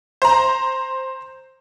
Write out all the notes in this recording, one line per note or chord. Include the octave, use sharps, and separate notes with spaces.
C5 A#5